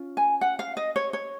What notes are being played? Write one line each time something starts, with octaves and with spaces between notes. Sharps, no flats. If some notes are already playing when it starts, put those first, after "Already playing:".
Already playing: C#4 F4
G#5
F#5
F5
D#5
C#5
C#5